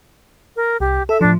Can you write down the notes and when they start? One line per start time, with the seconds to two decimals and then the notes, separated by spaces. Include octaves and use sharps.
0.56 A#4
0.80 C2 G4
1.09 A4 E5
1.21 A2 F3 D4